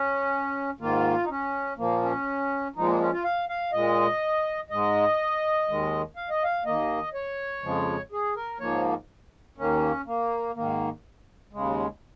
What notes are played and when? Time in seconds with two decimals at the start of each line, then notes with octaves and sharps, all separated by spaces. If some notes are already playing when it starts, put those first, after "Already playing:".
Already playing: C#4
0.80 G#2 D#3 A#3 F4
1.24 D#4
1.30 C#4
1.78 A#2 F3 A#3
2.02 C#4
2.76 A#2 F3 G#3 D#4
2.88 A#3
3.00 C#4
3.12 F4
3.24 F5
3.49 F5
3.73 A#2 G#3 D#5
4.70 G#2 G#3 D#5
5.68 D#2 D#3 G#3
6.16 F5
6.30 D#5
6.44 F5
6.65 D#2 D#3 A#3 D#5
7.14 C#5
7.63 F2 C#3 F3 G#3
8.12 G#4
8.36 A#4
8.60 G#2 F3 A#3 C#5
9.58 D#2 D#3 A#3 C#4
10.06 A#3
10.55 G#2 D#3 A#3
11.53 D#2 C#3 G#3